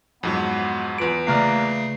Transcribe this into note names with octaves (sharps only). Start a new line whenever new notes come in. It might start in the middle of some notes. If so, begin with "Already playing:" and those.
F2 G#2 F#3 B3
E2 F4 B4 D7
C#3 A3 A#3 D5 F6 F#6 C7